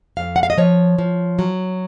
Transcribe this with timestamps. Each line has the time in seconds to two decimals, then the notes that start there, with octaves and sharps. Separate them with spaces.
0.17 F2 F5
0.36 F#5
0.43 F5
0.50 D#5
0.58 F3 C#5
0.98 F3
1.39 F#3